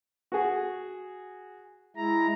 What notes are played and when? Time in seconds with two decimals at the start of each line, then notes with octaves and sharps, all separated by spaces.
0.32 F#4 G#4
1.97 G#3 E4 A#5